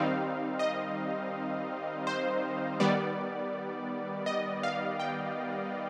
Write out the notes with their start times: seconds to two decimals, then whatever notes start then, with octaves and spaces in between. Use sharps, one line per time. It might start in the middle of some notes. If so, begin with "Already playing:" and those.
Already playing: D#3 G3 C4 D#4 F5
0.59 D#5
2.07 C5
2.80 D#3 G3 B3 D5
4.26 D#5
4.63 F5
5.00 G5